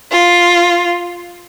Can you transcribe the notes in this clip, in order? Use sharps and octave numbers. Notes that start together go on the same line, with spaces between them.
F4